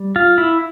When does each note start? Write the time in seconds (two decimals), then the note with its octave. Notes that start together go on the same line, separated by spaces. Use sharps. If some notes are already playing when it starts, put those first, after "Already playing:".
Already playing: G3
0.16 F4
0.38 E4